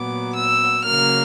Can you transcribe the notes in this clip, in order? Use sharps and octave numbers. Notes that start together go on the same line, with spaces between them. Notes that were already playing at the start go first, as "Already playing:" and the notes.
Already playing: A#2 F#3 B3 D6
E6
C#3 F#3 A#3 F6